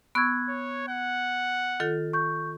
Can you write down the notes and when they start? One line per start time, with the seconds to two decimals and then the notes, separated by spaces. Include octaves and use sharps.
0.15 B3 C#6 E6 F#6 G#6
0.49 C#5
0.88 F#5
1.80 D#3 F4 A4
2.13 C#6 G6